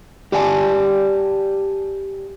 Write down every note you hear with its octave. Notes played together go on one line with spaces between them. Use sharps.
G4 D5 F5 G#5 A5